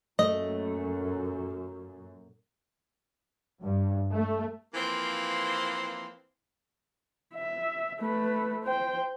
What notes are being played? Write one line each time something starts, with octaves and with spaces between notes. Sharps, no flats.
F#2 A#2 A3 D#5
G2
A3
E3 F3 A#3 C4
E5
A3 B4
C5 G5